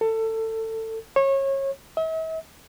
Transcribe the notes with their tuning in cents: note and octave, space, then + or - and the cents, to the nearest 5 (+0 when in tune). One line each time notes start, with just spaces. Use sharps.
A4 +20
C#5 -25
E5 -45